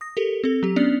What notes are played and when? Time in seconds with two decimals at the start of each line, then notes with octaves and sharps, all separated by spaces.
0.01 D#6 A#6
0.17 G4 A4 A#4
0.44 C4 A4
0.63 F#3 G4
0.76 B3 C#4 D4 D5 C#7 F7